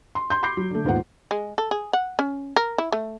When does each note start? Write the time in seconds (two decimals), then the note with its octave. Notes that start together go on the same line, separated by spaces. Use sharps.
0.15 C6
0.30 C6 G6
0.43 B5 C6 D6 G6 C7
0.57 F#3
0.71 D3 A3
0.84 D#1 D#2 G#2 B3 F4 F#5
1.31 G#3
1.58 A4
1.71 G#4
1.93 F#5
2.19 C#4
2.56 A#4
2.78 E4
2.92 A3